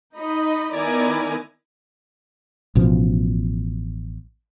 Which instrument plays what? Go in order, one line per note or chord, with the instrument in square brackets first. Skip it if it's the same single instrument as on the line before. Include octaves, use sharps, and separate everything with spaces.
[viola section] D#4 D#5 B5
D#3 B3 E4 D5 G#5 A#5
[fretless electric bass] A1 B2 F3